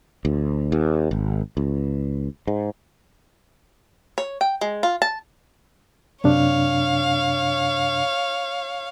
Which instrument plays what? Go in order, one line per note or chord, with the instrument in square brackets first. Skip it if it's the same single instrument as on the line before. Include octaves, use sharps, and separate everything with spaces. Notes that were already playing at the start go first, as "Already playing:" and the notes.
[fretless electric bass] D2
D#2
G#1
C#2
G#2
[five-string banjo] C#5
G5
G#3
F4
A5
[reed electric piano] F#2 C3 D4 [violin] C#5 F5